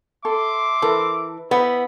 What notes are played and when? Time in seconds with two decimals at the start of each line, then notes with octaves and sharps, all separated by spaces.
0.25 A4 E5 C6 D6
0.82 E3 A4 A#4
1.51 B3 E4 C5 D#5 F#5 B5